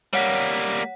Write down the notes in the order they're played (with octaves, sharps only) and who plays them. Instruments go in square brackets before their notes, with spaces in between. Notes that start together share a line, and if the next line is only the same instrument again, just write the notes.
[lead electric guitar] G3 A#3 [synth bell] C#5 F#5 B6